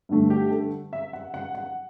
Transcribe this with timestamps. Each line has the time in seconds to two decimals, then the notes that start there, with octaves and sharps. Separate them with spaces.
0.09 G2 D3 A3
0.30 G4
0.51 A4
0.93 E5
1.13 F#5
1.34 F#5
1.55 F#5